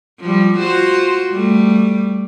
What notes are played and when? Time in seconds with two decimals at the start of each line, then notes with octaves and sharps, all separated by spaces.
0.20 F3 G3
0.58 F4 F#4 C5
1.31 G3 A3